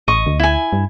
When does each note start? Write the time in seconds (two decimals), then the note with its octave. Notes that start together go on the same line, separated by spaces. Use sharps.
0.08 A1 D#5 C#6
0.27 D2
0.40 E4 G#5
0.73 G2